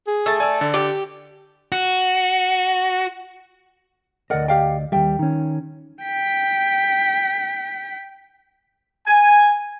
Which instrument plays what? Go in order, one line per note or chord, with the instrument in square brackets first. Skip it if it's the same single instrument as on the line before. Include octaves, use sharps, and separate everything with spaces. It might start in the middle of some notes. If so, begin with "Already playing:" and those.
[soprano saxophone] G#4
[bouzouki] A3 [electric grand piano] E6 A6
[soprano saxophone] D5 [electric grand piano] G#5 E6
[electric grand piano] D3 [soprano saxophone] D5
[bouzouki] G4
[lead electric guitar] F#4
[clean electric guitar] D2 D5 D#5 [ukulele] A#4 F#5
[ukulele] G4 F5 G5
[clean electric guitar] D#2 G3 [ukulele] E5 G5
[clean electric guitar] D#3 C#4
[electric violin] G5 B6
[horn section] G#5